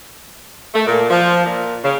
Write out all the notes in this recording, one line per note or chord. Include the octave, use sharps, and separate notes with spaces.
A3
A#2
F3
A#2
C#3